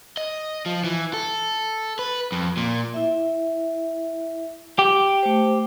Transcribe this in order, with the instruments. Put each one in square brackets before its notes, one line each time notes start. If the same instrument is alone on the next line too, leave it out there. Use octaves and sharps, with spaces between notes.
[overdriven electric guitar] D#5
F3
E3
A4
B4
F2
A#2
[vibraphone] E4 E5
[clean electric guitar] G4 [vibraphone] G5
[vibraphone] A3 C5